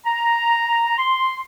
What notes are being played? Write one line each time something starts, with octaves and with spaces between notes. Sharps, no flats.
A#5
C6